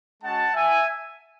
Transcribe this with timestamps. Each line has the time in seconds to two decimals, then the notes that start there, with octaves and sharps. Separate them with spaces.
0.23 G#3 C#4 F#4 F#5 A5
0.54 E5 G#5